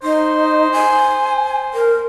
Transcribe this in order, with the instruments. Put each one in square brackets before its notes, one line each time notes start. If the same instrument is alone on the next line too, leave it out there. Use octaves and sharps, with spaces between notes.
[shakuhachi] D#4 [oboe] C5
[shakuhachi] G#5
A#4